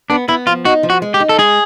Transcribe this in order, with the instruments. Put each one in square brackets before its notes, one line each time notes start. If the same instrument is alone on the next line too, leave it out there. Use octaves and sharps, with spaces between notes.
[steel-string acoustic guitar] B3 [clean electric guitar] D4
[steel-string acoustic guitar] B3 [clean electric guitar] E4
[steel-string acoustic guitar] F3 [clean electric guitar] F4
[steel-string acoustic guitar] D#4 [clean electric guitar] F#4
[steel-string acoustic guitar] F3
[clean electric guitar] F#4
[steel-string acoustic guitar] G#3
[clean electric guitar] G4
[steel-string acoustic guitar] D#4
[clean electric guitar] A4
[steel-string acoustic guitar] G#3 [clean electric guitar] G#4